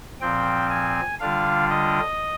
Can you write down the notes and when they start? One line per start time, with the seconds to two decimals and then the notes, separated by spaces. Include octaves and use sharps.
0.21 A#2 F3 C4 G5
0.70 G#5
1.20 D3 G3 D4 F4 F5
1.70 D#5